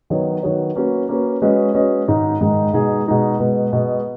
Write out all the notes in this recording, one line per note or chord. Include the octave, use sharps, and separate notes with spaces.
D#3 F#3 B3 F#4 C#5
D#3 F#3 B3 F#4 C#5
A#3 C#4 F#4 B4
A#3 C#4 F#4 B4
G#3 C#4 F#4 B4 D#5
G#3 C#4 F#4 B4 D#5
G#2 D#3 G#3 D#4
G#2 D#3 G#3 D#4
B2 G#3 D#4 G#4
B2 G#3 D#4 G#4
B2 G#3 B3
B2 G#3 B3